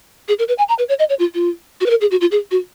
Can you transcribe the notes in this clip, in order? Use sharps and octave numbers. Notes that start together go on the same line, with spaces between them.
G#4
A#4
B4
G#5
A#5
B4
C#5
D#5
C#5
F4
F4
F#4
B4
A#4
G#4
F#4
F4
G#4
F#4